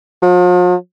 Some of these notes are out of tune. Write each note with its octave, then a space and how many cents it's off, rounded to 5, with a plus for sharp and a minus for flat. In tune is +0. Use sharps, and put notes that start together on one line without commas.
F3 +45